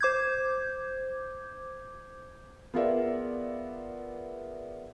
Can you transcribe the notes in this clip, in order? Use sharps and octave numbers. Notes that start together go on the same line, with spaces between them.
C5 D6 G6 G#6
B3 F4 G#4 A#4 D5 E5